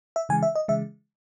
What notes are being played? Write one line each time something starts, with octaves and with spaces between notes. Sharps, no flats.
E5
C#3 E3 G#3 G#5
E5
D#5
C#3 E3 G#3 E5